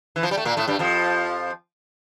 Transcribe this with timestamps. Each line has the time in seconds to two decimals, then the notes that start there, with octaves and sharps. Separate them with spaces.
0.16 E3
0.23 F3
0.31 G3
0.37 A3
0.45 A#2 A#3
0.57 A2 A3
0.68 G2 G3
0.79 F2 F3